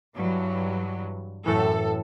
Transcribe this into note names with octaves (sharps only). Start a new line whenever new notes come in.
G2 E3 F#3
F#2 A2 E3 A4